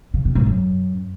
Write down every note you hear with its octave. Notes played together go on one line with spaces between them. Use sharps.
C#3
B2
G#2
F#2